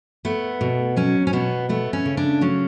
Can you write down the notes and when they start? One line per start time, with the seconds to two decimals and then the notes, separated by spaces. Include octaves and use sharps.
0.25 A3 B3
0.61 B2
0.96 F#3 C#4
1.27 C#4
1.33 B2 B3
1.69 A3 B3
1.93 C#4
2.06 C#3
2.17 D4
2.41 F#3 C#4